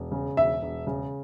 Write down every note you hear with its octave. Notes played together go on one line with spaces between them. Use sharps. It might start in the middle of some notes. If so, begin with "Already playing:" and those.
Already playing: E1
C#3
E1 E5
E1
C#3